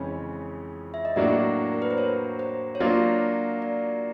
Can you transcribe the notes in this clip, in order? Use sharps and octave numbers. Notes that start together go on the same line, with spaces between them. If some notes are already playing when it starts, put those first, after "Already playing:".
Already playing: F2 C#3 E3 G#3 C#4 C#5
E5
D#5
A2 F#3 A#3 D4 F#4 D5
A#4
B4
C5
C#5
C5
C#5
F#3 A#3 D4 F4 D5
D5